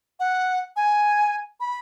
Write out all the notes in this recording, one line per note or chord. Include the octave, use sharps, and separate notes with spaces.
F#5
G#5
B5